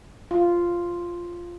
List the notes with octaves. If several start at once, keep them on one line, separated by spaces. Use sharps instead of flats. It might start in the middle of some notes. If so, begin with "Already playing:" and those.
F4